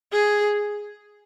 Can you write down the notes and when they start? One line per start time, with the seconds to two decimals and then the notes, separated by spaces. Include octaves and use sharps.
0.12 G#4